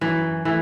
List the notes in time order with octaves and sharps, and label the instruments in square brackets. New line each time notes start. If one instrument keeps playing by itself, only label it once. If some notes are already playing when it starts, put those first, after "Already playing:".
[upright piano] F#2 [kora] E3
[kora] E3 [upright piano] A3 E4